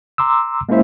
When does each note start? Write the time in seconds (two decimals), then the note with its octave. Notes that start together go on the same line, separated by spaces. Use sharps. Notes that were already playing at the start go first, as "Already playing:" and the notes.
0.18 A#5 C6 D6 E6
0.69 G#3 A#3 C#4 E4 C5 E5